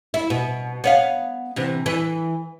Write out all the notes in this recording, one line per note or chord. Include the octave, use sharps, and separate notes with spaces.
E4
B2
B3 C#5 F5
C3 E3
E3 B4